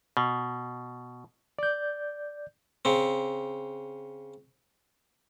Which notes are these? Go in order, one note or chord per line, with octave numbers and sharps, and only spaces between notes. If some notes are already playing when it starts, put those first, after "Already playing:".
B2
D5 G6
C#3 C4